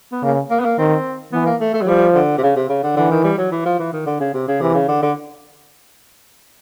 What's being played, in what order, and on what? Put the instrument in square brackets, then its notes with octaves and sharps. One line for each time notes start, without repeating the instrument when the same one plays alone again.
[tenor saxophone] B3
[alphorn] C#3 [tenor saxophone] A#3
[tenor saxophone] A#3
B3
A#3
[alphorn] D#3 [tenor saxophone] C4
[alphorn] E3 [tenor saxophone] B3
[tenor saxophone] A#3
A3
A3
F#3
[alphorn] F3 [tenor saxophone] G3
[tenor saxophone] D3
C3
C#3
C3
C#3
D3
[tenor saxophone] D3 [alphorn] E3
[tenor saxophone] D#3
G3
F#3
E3
F3
E3
D#3
D3
C#3
C3
C#3
[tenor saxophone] C3 [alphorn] E3
[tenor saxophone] C#3
D3
D3